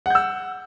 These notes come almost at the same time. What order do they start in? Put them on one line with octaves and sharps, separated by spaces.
F#5 G6 E6